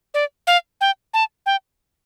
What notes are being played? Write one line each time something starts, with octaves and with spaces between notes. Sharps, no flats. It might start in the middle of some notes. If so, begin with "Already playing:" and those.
D5
F5
G5
A5
G5